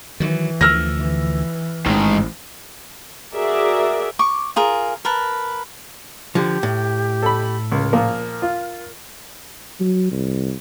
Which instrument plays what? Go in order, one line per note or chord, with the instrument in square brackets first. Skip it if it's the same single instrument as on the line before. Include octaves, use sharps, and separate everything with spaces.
[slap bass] D#3 F#3 [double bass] E3
[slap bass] D2 D3 F3 [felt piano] E6 F6 A#6
[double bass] E3
[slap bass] A1 [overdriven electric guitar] G#2 D#3
[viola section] F#4 G#4 A#4 D5 E5
[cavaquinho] C#6 D6
F4 G#4 A#4
A#4 B4 A5
[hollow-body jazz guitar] D3 F3 [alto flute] G4
[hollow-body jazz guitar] A2
[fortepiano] A4 B5
[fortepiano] C#2 [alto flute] A#4
[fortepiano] A#2 F3 A#3
F4
[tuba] F#3
C2